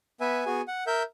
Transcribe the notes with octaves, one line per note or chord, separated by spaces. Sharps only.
B3 B4 E5 G#5
B3 F#4 G#4 G#5
F#5
A#4 E5 G6